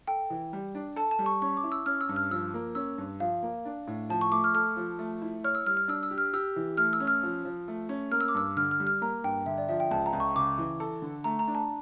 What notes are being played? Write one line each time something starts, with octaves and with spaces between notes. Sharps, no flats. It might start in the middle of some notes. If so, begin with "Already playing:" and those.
A4 G5
E3
G3
D4
A4 A5
A5
G3
C#6
C#4 C#6
D6
E4
E6
C#4 F6
E6
G2
F6
F3 E6
A#3
C#4 E6
G2
F3 F5
A#3
D4
A2
F3 A5
C#6
A3 D6
F6
A4 F6
F3
A3
E4
C#5 F6
E6
G3 F6
F6
D4 E6
E6
G4
F6
G4 E6
E3
A3 F6
E6
C#4
F6
F3
F3
A3
C#4
A#3 F6
E6
D6
G2 E6
D3 F6
F6
G3
F6
A#3 A#5
G2 G5
D3 E5
D5
F3 E5
G5
C#2 A5
A#5
C#2
C#6
C#3 D6
E3
A4
D3
A3 A#5
A#5
D4
A5